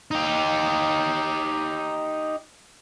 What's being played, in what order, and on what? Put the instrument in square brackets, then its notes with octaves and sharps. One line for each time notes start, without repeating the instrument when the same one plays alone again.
[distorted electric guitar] D#4 G4